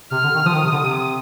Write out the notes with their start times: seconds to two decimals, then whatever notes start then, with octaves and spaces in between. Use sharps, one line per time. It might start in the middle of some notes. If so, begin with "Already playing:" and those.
0.12 C3 F6
0.23 D3
0.34 D#3
0.45 F3 D#6
0.54 D#3
0.63 C3
0.72 D3
0.80 C3